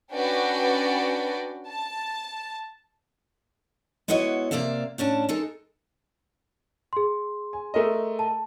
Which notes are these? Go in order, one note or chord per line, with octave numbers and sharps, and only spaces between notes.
C#4 D4 F#4 B4 D5 G5
A5
G#3 B3 E4 F#4 C#5 D#5
C3 A#3 D5 E5 F5
A2 C#4 D4 A5
G#3 D#4 A4 A#4
G#4 C6
G#5
A3 A#4 D#5
A5